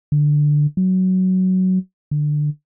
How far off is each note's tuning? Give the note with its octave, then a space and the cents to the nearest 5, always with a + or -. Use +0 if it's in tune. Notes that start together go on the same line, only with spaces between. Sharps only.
D3 +5
F#3 +10
D3 +15